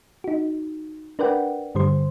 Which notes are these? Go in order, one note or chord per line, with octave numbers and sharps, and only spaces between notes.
D#4 F#4
D4 A#4 B4 D5 F#5 G5
G2 D3 G3 C5 C6